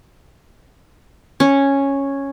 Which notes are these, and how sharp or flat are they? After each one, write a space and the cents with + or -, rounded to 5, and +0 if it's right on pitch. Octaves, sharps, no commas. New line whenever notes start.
C#4 -5